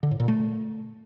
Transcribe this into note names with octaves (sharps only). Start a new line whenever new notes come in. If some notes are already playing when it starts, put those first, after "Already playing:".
D3
A2
A#2
A3